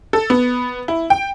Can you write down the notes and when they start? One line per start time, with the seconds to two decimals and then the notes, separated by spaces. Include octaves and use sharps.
0.13 A4
0.30 B3
0.88 E4
1.10 G5